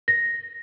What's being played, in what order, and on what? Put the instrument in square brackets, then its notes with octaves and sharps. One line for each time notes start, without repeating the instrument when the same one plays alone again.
[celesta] A#6